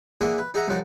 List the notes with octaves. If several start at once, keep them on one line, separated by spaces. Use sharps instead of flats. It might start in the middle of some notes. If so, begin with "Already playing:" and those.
E3 A#3 D4 G#4 E5 F#5
B4
D#4 G#4 E5 F#5 A#5
C2 F2 F#3 D#4 A5